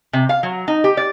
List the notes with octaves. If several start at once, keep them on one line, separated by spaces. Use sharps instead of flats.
C3
F5
F#3
D#4
G4
D5